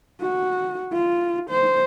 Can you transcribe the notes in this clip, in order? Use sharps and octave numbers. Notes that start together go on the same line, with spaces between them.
F#4
F4
C5